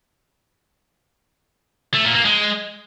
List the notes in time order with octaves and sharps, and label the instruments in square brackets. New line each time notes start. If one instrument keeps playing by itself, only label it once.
[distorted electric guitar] A3
A#2
A#3
G#3